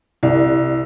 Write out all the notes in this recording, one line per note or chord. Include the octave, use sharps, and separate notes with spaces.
C2